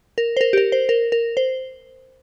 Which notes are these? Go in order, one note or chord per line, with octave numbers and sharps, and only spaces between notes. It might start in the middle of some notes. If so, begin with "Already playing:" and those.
A#4
C5
A#4
G4
A#4
C5
A#4
A#4
C5